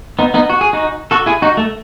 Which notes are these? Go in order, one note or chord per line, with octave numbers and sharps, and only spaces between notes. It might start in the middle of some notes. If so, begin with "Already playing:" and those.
B3 D#4
B3 D#4
F#4
G#4
D#4 F#4
F#4 A4
E4 G#4
D#4 F#4
A3